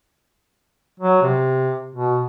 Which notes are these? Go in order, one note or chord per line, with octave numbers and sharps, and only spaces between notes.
F#3
C3
B2